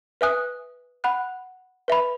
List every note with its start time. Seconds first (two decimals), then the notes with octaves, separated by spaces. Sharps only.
0.21 B4 E5 G#5 D#6 F#6
1.04 F#5 B5 F#6
1.88 B4 E5 B5